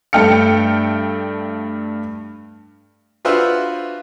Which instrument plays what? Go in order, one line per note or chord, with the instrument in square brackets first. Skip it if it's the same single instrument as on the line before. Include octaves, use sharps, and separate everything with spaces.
[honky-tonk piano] G2 A3 G5 F6 C#7
[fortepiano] D4 F4 F#4 B4 C5 E5